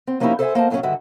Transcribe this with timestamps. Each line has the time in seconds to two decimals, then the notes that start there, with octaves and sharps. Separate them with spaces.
0.07 C4
0.20 F3 A#3 C#4 D#4 E4 G4
0.39 A4 B4 C5 D#5 E5 G#5
0.55 A#3 C5 D#5 A5
0.70 F#2 A#2 F#3 G3 C#4 D4
0.83 G2 D3 D#3 F#4 E5